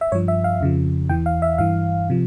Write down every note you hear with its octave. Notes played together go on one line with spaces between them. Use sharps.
E5
G2 F3 C#5
E5
F5
F2 C#3 F3
E2 E3 G5
F5
E5
G2 E3 F5
C3 F3